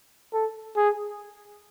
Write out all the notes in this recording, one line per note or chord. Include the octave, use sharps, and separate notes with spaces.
A4
G#4